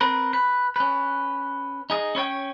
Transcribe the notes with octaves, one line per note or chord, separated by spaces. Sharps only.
C4 A#4 B4
B4
C#4 B4
D#4 G#4 D#5
C#4 E4 C#5 G5